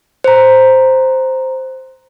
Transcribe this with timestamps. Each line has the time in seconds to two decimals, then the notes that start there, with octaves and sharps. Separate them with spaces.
0.24 C5 A#5